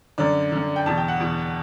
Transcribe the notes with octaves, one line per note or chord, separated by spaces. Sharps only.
F#2 D3 D5
F#2 D3
G5
E2 B2 A5
G5
F#5
E2 B2